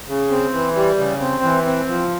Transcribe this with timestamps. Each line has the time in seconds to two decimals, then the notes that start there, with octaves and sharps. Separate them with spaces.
0.08 C#3
0.31 C4
0.53 E3
0.76 G3
0.98 C#3
1.21 C4
1.43 E3
1.66 C4
1.89 F3